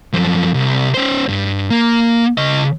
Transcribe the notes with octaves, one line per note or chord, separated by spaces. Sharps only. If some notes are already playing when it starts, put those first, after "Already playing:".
F#2 F3
C2
C#4 C5
G2
A#3
C#3 D#5